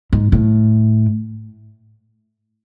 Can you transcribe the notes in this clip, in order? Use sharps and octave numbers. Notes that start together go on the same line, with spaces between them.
G#2
A2